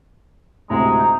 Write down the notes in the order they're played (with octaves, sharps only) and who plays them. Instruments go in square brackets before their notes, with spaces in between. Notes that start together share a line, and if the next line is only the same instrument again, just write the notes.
[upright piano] D2 A2 C3 [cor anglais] G#3 [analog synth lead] A#5
[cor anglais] D#4